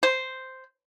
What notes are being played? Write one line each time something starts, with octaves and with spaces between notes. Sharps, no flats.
C5